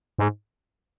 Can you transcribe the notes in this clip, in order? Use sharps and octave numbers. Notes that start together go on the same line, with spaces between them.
G#2